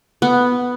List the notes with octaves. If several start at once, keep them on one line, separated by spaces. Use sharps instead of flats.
B3